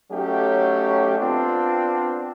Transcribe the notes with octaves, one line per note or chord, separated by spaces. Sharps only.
F#3 A3 C#4 D#4 G4
B3 C4 D4 F4